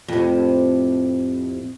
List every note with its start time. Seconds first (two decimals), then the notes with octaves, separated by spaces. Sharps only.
0.08 F2 A2 C3